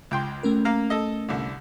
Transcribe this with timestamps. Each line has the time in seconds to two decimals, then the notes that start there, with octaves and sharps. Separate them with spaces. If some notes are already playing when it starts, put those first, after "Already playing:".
0.11 C#2 G5 C6
0.43 A3 C#4 A#4
0.65 A#3 F5 A#5
0.90 A4 D#5
1.29 C2 D3